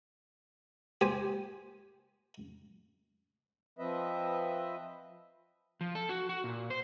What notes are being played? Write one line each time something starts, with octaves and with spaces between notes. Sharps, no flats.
G4 C5 G#5
F3 C4 B4 D#5 E5
F3
A4
F#4
F#4
A#2
C5